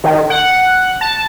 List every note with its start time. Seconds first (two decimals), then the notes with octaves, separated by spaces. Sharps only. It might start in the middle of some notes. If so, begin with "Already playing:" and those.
0.04 D#3
0.30 F#5
1.01 A5